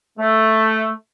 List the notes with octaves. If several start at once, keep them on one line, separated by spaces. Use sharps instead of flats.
A3